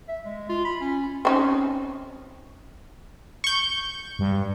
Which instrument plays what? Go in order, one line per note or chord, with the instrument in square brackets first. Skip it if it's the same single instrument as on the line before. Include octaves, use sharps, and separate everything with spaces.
[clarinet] E5
G#3
F4
B5
C#4
[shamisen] C4 C#4 D#4
[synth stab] C#6 G6
[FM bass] G2